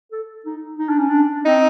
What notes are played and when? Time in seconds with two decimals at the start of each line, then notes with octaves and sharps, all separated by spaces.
0.12 A4
0.46 D#4
0.79 D#4
0.89 D4
0.98 C#4
1.09 D4
1.45 C4 D#4